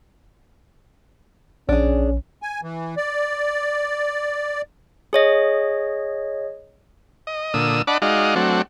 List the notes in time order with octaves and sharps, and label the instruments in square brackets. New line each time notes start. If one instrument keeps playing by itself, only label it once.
[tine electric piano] A#1 [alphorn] C#4 [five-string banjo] D4 G#4
[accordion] G#5
E3
D5
[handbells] G#4 C#5 D#5
[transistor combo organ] D#5
A#2 D3 D#6 E6
D4 D5 D#5 F#5 A5 B5
G#3 D#4 F#4 D5 D#5 F5
F#3 A3 C4 D4 F#4